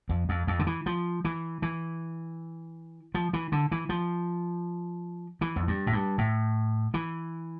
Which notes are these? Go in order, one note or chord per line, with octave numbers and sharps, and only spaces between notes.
F2
F2
F2
D3
E3
F3
E3
E3
F3
E3
D3
E3
F3
E3
F2
G2
A2
G2
A2
E3